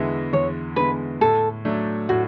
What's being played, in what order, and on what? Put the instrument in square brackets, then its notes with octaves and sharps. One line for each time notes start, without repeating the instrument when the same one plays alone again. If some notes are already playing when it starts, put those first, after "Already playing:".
Already playing: [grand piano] E2 D3 G#3 B3 E4
[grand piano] E2 [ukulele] C#5
[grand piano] D3 G#3 B3 E4 [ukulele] B4
[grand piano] A2 [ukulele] A4
[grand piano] F#3 A3 D4
[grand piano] A2 [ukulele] F#4